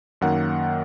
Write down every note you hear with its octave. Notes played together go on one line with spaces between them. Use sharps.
F#2 D#3 A#3 F#5